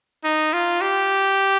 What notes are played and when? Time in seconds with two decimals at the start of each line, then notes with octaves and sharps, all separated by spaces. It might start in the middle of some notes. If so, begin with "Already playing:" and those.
0.24 D#4
0.53 F4
0.81 G4